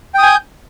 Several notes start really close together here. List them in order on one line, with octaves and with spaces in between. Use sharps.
G5 D#6 G#5 G6